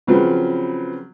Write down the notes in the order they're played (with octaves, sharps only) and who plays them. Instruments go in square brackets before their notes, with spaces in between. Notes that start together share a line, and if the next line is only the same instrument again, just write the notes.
[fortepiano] C#3 F3 F#3 C4 B4